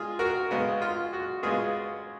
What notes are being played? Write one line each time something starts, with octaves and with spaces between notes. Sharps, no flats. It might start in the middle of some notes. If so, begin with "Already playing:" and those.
Already playing: G#3 F4 G#4
F#4 A#4
C#3 G#3 B3
F4
F#4
C#3 G#3 B3 F4 G#4